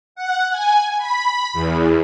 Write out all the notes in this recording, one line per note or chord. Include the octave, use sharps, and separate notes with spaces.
F#5
G#5
B5
E2